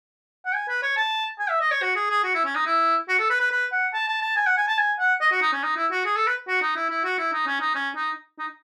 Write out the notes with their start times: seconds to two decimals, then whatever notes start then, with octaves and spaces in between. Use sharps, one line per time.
0.46 F#5
0.54 G#5
0.69 B4
0.82 C#5
0.97 A5
1.39 G#5
1.49 E5
1.60 D#5
1.71 C#5
1.82 F#4
1.96 G#4
2.10 G#4
2.24 F#4
2.35 E4
2.45 C#4
2.55 D#4
2.66 E4
3.08 F#4
3.19 A4
3.30 B4
3.40 B4
3.51 B4
3.72 F#5
3.94 A5
4.07 A5
4.22 A5
4.36 G#5
4.46 F#5
4.57 G#5
4.68 A5
4.78 G#5
4.99 F#5
5.21 D#5
5.31 F#4
5.42 D#4
5.53 C#4
5.63 D#4
5.77 E4
5.91 F#4
6.05 G#4
6.16 A4
6.27 B4
6.48 F#4
6.62 D#4
6.76 E4
6.90 E4
7.04 F#4
7.18 E4
7.33 D#4
7.47 C#4
7.61 D#4
7.75 C#4
7.96 D#4
8.39 D#4